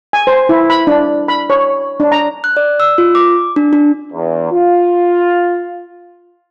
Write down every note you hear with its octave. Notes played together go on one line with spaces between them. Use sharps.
G#5
C5
E4
B5
D4
B5
C#5
D4
A#5
F#6
D5
E6
F4
D6
D4
D4
E2
F4